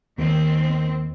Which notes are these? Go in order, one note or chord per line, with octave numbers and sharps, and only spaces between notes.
D#2 D#3 C4